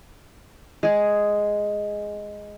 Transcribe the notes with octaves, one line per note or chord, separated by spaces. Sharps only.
G#3 G#4